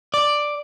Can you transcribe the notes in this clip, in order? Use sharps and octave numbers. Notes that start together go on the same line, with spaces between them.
D5